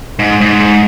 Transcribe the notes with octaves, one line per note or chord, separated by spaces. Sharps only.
G#2
G#2